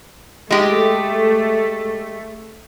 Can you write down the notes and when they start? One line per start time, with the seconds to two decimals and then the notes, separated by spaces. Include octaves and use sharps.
0.50 G#3 A3 G4